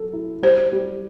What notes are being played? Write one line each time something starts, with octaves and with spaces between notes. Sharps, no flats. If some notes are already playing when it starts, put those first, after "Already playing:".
Already playing: F#3 A4
E4
G3 C5
G3